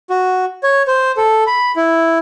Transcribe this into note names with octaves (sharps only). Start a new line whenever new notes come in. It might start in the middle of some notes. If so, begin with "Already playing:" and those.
F#4
C#5
C5
A4
B5
E4